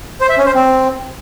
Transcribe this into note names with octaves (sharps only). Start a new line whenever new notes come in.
C5
E5
C#4
C5
C4